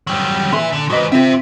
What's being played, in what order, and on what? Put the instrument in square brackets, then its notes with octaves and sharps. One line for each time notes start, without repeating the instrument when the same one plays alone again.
[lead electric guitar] F#3 G3
[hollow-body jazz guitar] A#2 G#4 C6 [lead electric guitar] B4 E5
[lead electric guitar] D3
[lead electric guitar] G#2 B4 [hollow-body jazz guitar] F#4 D#5
[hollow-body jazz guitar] C4 F4 [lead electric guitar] C5 E5